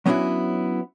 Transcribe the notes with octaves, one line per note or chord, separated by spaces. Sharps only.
F#3 B3 C#4 D4 E4 F#4